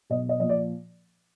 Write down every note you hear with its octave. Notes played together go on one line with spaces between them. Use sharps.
B1 D#5
D#5
A#2 F3 D#5
D5